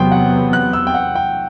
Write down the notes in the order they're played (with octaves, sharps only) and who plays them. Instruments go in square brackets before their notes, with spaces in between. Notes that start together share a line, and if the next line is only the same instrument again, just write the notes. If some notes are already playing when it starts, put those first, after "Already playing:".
Already playing: [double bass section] E2 C3 F#3 B3 [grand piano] G5 C6
[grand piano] F#5
F#6
E6
G5
F#5
G5